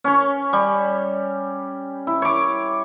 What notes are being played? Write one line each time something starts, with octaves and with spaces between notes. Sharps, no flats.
C#4 C#5
G3
E4
C#5 D6